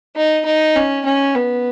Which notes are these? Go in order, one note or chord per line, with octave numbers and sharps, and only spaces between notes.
D#4
D#4
C#4
C#4
B3